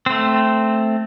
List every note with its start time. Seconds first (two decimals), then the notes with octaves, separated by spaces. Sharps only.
0.06 A3 C4